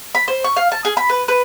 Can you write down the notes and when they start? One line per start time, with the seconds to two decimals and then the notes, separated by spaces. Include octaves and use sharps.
0.15 B5
0.28 C5
0.44 C#6
0.56 F5
0.72 A5
0.85 G#4
0.97 B5
1.09 B4
1.28 B4